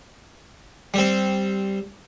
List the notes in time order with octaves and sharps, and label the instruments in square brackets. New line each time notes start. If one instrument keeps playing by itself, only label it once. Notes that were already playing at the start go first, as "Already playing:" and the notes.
[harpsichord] G3 C4